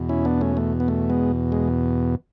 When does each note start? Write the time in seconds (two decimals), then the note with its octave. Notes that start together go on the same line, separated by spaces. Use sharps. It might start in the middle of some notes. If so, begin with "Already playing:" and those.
Already playing: E2 B2
0.09 C#4 E4
0.25 B3 D4
0.41 A3 C#4
0.57 A3
0.80 B3
0.88 A3
1.10 G#3 B3
1.52 G#3